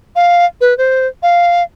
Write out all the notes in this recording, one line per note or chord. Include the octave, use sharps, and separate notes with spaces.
F5
B4
C5
F5